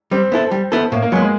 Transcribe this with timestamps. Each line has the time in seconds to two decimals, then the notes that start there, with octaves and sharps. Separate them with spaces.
0.11 G3 C4
0.32 B3 E4 A4
0.51 G3
0.72 B3 E4 A4
0.92 A2 A#3
1.02 A#3
1.12 F#3 G#3
1.15 B3
1.22 G#3